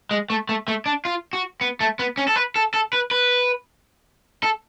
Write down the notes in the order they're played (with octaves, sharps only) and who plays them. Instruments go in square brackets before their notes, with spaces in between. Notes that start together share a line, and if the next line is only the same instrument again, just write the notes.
[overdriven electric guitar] G#3
A3
A3
A3
D4
F4
F#4
B3
A3
B3
C#4
A4
B4
A4
A4
B4
B4
A4